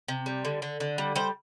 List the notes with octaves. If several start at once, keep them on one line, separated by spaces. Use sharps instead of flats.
C3
G3
D3
D3
D3
G3
G3 C5